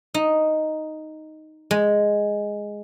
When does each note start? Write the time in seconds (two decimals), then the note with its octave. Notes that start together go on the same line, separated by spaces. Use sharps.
0.14 D#4
1.71 G#3